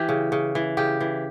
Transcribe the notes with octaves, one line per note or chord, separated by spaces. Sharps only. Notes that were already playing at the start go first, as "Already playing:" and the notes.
Already playing: E3 G4
C#3
C#3
E3
C#3 G4
E3